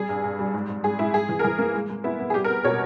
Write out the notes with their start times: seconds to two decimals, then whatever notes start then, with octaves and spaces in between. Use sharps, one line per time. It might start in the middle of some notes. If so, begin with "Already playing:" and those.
Already playing: G3 G#4
0.09 G2
0.23 G2
0.39 G3
0.54 G#2
0.69 G#2
0.84 G#2 G#4
0.99 G#2 E4
1.14 G#2 G#4
1.29 E3
1.39 A#4
1.44 E3 G#4
1.59 A#3
1.74 G#3
1.89 G#3
2.04 B3 E4
2.19 B3
2.30 G#4
2.34 G3 G4
2.44 A#4
2.49 B3
2.64 B2 C#5